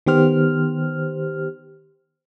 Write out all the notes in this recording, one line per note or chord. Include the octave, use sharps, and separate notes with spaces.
D#3 B3 G4 C5 F6